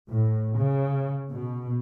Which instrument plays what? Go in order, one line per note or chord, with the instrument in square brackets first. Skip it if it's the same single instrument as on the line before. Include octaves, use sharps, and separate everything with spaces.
[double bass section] A2
C#3
B2